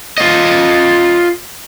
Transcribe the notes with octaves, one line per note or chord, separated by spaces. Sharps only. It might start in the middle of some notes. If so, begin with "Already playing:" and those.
F4 D#5